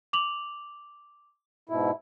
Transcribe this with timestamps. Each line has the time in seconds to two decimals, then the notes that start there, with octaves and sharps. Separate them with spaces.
0.13 D6 F7 F#7
1.69 G#2 B2 E4